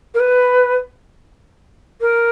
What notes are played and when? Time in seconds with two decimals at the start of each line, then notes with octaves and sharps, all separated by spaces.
0.14 A#4
0.20 B4
2.01 A#4